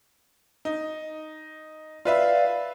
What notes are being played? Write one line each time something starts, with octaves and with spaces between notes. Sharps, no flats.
D#4
F4 B4 D5 E5 F5